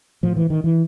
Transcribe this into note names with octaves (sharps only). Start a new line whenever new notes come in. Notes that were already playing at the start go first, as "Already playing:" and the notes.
A2 F3
E3
D#3
E3